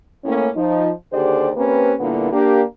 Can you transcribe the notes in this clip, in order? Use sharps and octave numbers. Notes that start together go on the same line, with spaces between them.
A2 A#3 C#4
F3 D#4
D#2 D3 G4 G#4 C5 D5
A#3 C4 C#4 G4 B4
G2 A#2 D3 A#3 B3 E4
A#3 D4 G4